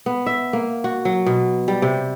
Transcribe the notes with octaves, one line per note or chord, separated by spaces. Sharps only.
B3
E5
A#3
F#4
F#3
B2
G3
C3